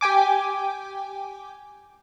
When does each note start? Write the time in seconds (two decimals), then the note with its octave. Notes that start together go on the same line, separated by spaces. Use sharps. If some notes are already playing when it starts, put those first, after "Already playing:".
0.01 G4 G5 G#5 D6